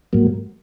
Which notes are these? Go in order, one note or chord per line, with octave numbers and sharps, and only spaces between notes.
G#2 F#3 A#3